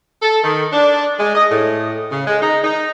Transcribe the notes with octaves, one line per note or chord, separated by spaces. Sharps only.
A4
D#3
D4
G#3
D#5
A2
C#3
G#3
D#4
D#4